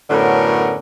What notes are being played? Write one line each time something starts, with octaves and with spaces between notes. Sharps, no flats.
F#2 A2 D3 B3 C#4 A#4